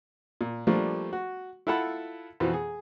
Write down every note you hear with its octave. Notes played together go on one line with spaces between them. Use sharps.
A#2
F3 G3 A3 A#3 D4
F#4
E4 F4 A4 F#5 A5 B5
F2 B2 E3 F3
G#4